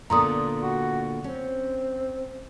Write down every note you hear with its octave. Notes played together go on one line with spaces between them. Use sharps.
A#2 D3 B3 A#5 C6 D#6
F#4
C4 C#4